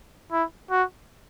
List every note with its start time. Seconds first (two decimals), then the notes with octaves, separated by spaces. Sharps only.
0.32 E4
0.71 F#4